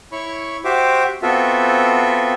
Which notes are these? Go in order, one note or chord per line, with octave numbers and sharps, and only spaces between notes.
E4 C#5 B5 C#6
F#4 G4 C5 E5 D6
B3 C4 F4 F#4 A4 E5